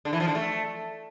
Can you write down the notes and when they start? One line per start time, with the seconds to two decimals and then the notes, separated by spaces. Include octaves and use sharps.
0.05 D3
0.13 E3
0.20 F3
0.28 D3
0.35 A3